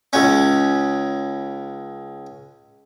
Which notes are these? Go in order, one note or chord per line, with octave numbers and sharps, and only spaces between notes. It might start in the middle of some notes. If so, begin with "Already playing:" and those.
C#2 C#4